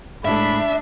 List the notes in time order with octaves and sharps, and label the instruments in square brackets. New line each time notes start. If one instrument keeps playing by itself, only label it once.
[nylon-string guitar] A2 G#3 A4 [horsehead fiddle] D4 [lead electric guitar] E5 [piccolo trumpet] B5